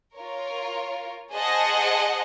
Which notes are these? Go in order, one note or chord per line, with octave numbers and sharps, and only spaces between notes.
F4 A#4 C#5
G#4 C5 D#5 F#5 A5